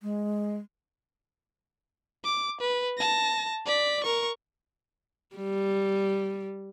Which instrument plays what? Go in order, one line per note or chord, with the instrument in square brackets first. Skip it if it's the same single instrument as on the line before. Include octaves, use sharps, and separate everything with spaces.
[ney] G#3
[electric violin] D6
B4
A5 A#6
D5 B6
A#4 C#6
[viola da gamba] G3